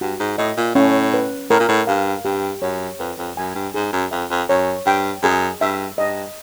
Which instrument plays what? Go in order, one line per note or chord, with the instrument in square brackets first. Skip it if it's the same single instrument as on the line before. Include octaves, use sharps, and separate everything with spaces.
[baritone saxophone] G2 [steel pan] F#4
[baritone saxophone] G#2
[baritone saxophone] A2 [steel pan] D#5
[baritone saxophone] A#2
[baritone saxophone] A2 [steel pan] C#4
[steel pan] B4
[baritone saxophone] A2 [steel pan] A#4
[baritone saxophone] A#2
A2
[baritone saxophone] G2 [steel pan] F5
[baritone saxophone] G2 [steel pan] G4
[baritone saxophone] F#2 [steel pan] C#5
[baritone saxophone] F2 [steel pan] B4
[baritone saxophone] F2
[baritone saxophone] F#2 [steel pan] G#5
[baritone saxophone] G2
[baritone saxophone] G#2 [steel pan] G#4
[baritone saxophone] F#2
[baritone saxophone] F2 [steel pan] E5
[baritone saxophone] F2
[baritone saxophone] F#2 [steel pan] C#5
[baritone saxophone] G2 [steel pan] G5
[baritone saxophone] F#2 [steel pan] G#4
[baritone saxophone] G2 [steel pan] E5
[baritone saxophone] G2 [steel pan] D#5